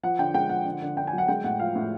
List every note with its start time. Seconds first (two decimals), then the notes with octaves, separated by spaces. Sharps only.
0.03 F3 F#5
0.19 D3 G5
0.34 G#3 G5
0.49 F3 F#5
0.66 D3
0.82 D3
0.97 D3 G5
1.07 G#5
1.13 F#3
1.18 F#5
1.28 G#3 G5
1.44 A2 F#5
1.59 F3 F5
1.75 A2